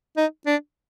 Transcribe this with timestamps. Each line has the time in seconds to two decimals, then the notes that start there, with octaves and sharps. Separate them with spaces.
0.17 D#4
0.46 D4